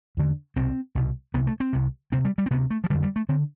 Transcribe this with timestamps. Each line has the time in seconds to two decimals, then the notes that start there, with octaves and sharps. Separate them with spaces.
0.17 E2 D3
0.56 C2 B2 C4
0.95 C2 B2
1.34 C2 B3
1.37 C3
1.47 A3
1.60 C4
1.73 C2 C3
2.12 D2 C3 C4
2.25 G3
2.38 G3
2.46 C4
2.51 D2 C3 B3
2.70 A3
2.84 F3
2.90 D3 G3
2.94 F2
3.03 G3
3.16 A3
3.29 D3 C4